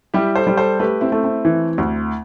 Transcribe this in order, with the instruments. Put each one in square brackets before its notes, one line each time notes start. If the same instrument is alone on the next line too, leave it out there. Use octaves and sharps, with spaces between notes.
[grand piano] G3 [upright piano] E4 G4
[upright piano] A4 C5
[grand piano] G3
[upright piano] A4 C5
[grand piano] A3 [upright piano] G4 B4
[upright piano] C4 E4
[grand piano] A3
[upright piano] C4 E4
[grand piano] E3
D2